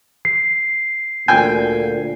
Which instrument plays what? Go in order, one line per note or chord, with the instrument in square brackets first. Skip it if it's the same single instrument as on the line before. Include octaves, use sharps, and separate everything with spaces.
[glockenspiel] C7
[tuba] D2 [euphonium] A#2 [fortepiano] G5 G#5